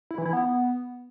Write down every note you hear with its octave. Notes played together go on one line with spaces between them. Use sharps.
E4
E3
E4
B3